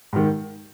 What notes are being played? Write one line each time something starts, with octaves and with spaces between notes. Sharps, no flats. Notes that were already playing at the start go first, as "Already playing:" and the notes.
G#2 D#3